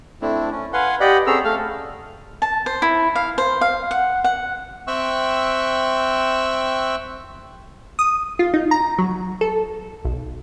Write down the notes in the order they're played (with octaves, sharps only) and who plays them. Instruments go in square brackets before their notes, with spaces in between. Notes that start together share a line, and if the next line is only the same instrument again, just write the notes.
[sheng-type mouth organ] A3 C4 D4 E4
C#4
B4 F5 F#5 G#5 C6
G4 D5 D#5 F#5 B5
C4 C#4 G#4 A4 A#5 E6
A3 F5 F6
[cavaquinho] A5
C5
E4
F5
C5
F5
F#5
F#5
[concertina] C4 E5 G5 C#6 E6 F#6
[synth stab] D#6
F4
D#4
A#5
F#3
A4
B1